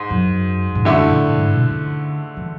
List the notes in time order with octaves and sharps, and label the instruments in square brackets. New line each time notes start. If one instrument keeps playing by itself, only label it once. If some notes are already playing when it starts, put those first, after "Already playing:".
Already playing: [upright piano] G#2
[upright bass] F#2
G#2
[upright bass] F#2 [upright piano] D3 A3 E4
[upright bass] A2
G#2
B2
D3
E3